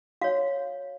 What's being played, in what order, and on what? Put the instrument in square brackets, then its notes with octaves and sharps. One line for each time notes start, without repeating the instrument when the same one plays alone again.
[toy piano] F#4 C#5 F5